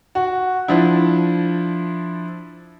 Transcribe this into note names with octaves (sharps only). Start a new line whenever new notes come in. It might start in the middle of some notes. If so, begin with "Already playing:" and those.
F#4
F3 D4 E4